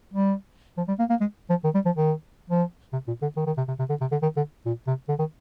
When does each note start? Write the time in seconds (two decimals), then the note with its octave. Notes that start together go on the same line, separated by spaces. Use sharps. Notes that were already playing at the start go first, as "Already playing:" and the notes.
0.14 G3
0.78 F3
0.88 G3
0.99 A#3
1.10 A#3
1.21 G#3
1.50 F3
1.64 D#3
1.75 G3
1.86 F3
1.96 D#3
2.50 F3
2.93 C3
3.08 A#2
3.22 D3
3.37 D#3
3.47 D#3
3.57 C3
3.68 C3
3.79 C3
3.90 D3
4.01 C3
4.12 D3
4.23 D#3
4.37 D3
4.66 A#2
4.87 C3
5.09 D3
5.19 D#3